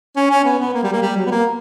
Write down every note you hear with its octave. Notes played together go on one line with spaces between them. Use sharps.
C#4
C#4
B3
B3
A#3
G3
A#3
G3
F#3
B3
A#3